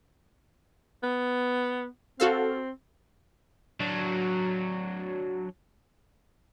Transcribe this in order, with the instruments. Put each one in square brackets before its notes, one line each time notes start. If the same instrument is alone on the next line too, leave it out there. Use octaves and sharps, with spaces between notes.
[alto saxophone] B3
[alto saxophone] C4 [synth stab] F#4 A4 F5
[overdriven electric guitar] F#3 D4